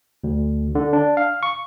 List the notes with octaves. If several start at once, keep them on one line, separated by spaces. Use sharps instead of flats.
D2
D3
D4
F5
C#6